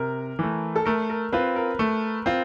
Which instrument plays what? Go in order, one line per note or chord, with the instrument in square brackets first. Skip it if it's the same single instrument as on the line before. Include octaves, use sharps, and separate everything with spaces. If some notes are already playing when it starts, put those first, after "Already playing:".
Already playing: [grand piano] C3 [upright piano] A#4
[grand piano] E3 A3
[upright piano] A4
[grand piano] A3 [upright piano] A#4
[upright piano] A#4
[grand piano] C4 F4 [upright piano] B4
[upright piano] A#4
[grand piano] A3
C4 F4